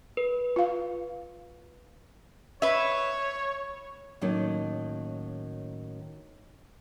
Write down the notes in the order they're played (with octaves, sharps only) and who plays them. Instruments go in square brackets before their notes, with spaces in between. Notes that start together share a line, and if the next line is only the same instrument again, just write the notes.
[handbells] B4
[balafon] F4 F5
[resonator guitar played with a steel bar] B4 E5 [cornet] C#5
[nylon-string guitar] A2 D#3 F#3 A#3 C#4 D#4